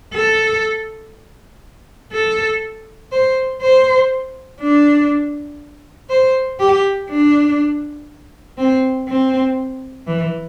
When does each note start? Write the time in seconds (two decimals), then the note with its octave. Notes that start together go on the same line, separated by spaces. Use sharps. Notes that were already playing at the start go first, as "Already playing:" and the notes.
0.14 A4
2.13 A4
3.12 C5
3.62 C5
4.61 D4
6.10 C5
6.60 G4
7.09 D4
8.58 C4
9.08 C4
10.07 E3